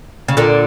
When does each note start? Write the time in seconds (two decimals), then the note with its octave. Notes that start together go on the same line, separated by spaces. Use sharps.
0.28 C#3
0.37 A#2 D3